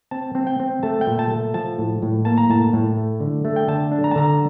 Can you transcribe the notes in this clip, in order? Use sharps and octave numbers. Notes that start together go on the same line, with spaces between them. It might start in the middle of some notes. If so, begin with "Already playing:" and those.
C4 A5
C4
G5
C4
A3 A5
G5
A#2
A5
A3
F3 A5
A2
A2
A#3 A5
A#5
A2 A5
A2
A3
D3
A3
G5
D3 A5
D4
A#5
A5
D3 A#5